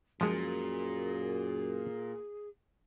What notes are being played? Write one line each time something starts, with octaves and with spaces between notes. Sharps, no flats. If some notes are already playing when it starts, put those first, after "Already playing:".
F#2 A#2 F3 G#3 G#4